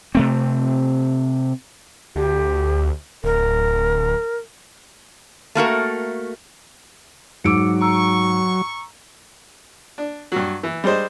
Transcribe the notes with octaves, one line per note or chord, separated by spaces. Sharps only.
C3 A3 C4
D2 G4
D1 A#4
A3 A#3 F#4 A#4
G#2 F#3 D6 E6 C#7 D7
A#5 C#6 E6
D4
G2 F#3
E3
G3 G#3 D4 C5 D#5